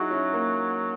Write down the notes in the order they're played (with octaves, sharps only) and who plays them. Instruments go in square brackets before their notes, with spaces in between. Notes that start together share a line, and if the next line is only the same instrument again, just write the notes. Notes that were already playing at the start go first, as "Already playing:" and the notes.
Already playing: [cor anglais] F#3 [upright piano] D#4 E4 F#4 G#4
[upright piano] C#4 E4
A#3